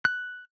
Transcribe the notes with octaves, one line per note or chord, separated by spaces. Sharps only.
F#6